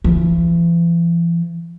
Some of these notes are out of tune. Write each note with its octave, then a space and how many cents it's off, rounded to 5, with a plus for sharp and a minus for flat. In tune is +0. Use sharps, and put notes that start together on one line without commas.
E3 +45